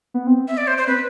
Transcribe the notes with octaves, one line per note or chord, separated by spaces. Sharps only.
B3
C4
E5
D5
C5
C5
C4 B4